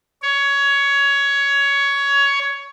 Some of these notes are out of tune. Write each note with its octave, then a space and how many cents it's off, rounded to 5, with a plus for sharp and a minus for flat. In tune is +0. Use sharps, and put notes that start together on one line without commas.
C#5 +15